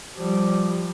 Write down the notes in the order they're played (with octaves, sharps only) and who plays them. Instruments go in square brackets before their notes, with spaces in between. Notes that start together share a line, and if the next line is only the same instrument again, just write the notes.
[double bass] F3 G3